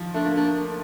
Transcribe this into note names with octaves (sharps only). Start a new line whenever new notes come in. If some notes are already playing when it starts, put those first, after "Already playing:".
Already playing: D#3 F3
A3 D4
A#3
A3 D4